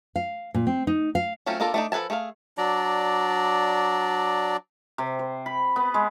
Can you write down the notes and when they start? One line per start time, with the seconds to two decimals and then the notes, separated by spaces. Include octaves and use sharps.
0.16 F5
0.54 A#2
0.67 C4
0.87 D#4
1.15 F5
1.46 F#3 A3 C4 C#4 F4
1.60 A#3 D4 F4 A4 A#4
1.74 A3 D4 D#4
1.92 F3 A4 B4 G#5 A5
2.10 A3 G#4 B4 F5
2.58 F#3 D4 D5 A#5
4.98 C3
5.19 C5
5.46 B5
5.76 B3
5.94 G#3